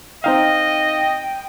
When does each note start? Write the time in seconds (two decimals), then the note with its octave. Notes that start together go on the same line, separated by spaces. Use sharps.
0.24 C4 D#4 D#5 F5 G5